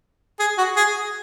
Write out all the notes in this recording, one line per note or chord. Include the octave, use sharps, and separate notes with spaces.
G#4
F#4
G#4